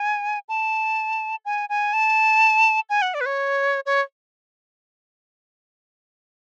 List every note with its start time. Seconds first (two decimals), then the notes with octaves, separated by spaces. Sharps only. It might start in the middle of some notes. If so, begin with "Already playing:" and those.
Already playing: G#5
0.49 A5
1.45 G#5
1.69 G#5
1.93 A5
2.90 G#5
3.02 F#5
3.14 D5
3.21 B4
3.26 C#5
3.86 C#5